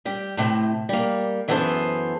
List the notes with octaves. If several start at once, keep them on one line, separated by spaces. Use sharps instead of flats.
G3 G4
A2 C3 A3
G3 A#3
F#2 E3 B3 G#4 A4 C5